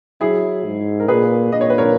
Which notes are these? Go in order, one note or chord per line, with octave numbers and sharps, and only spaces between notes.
F#3 E4 G#4
G#2
A#4
A#2 G#4 B4
A#2 D#5
C#5
B4
A#4 C#5